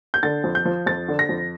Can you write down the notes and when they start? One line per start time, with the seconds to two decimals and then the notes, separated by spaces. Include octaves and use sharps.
0.14 G6
0.23 D3 A6
0.44 F2
0.55 G6
0.65 F3
0.86 F2 A6
1.08 D3
1.19 A#6
1.29 F2